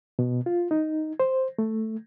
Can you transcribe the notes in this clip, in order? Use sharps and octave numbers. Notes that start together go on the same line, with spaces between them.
B2
F4
D#4
C5
A3